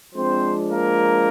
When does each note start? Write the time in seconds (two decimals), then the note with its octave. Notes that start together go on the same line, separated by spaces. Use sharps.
0.15 F3 G#3 C4 D4 C5
0.71 A#3 A#4